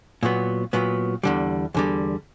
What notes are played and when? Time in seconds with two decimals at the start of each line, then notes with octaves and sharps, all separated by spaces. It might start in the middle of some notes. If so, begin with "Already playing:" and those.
0.23 A#2 F#3 B3
0.73 A#2 F#3 B3
1.23 E2 D3 G3
1.74 E2 D3 G3